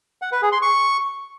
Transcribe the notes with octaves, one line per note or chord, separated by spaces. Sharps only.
F#5
B4
G#4
C6
C#6